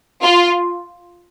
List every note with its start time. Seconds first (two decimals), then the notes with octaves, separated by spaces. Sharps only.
0.23 F4